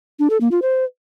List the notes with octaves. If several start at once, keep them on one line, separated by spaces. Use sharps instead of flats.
D4
A4
A#3
F4
C5